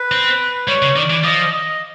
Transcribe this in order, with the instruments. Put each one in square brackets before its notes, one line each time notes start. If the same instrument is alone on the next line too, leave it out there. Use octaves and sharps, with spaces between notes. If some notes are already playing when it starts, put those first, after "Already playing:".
Already playing: [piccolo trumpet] B4
[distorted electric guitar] C4
[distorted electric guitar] G3 [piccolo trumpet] C#5
[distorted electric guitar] C#3
[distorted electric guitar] D#3 [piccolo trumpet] D5
[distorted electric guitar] E3
[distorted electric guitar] F3 [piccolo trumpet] D#5
[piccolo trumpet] D#5